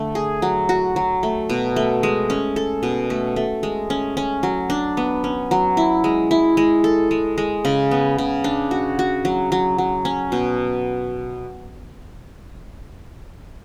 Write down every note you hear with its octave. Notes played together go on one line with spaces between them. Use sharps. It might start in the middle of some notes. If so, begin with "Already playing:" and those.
Already playing: D3 A3
G#4
F#3
F#4
F#3
A3
B2
A3
G#3
C#4
A4
B2
A3
A3
G#3
C#4
C#4
F#3
D4
B3
C#4
F#3
E4
G#3
E4
G#3
A4
G#3
G#3
C#3
B3
C#3
D4
F#4
F#4
F#3
F#3
F#3
C#4
B2